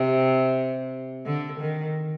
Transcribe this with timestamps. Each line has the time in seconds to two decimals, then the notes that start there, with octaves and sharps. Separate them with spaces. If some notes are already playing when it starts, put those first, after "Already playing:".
Already playing: C3
1.25 D3
1.60 D#3